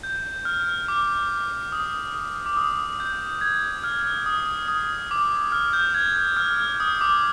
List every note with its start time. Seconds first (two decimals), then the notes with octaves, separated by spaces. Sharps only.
0.03 G6
0.45 F6
0.88 D6
1.72 D#6
2.15 D#6
2.46 D6
2.57 D#6
3.00 G6
3.41 G#6
3.84 F6
4.26 D#6
4.68 D#6
5.11 D6
5.52 F6
5.73 G6
5.94 G#6
6.37 F6
6.80 D#6
7.01 D6